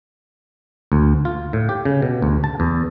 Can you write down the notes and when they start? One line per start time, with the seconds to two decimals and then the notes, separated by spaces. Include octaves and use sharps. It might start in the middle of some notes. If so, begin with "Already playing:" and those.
0.92 D2
1.25 F4
1.53 A2
1.69 G4
1.85 C#3
2.02 B2
2.22 D2
2.44 A5
2.60 E2